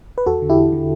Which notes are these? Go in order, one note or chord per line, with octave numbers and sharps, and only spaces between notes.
B4
E2 F#4 A4
D3
E4 G4
E2
D3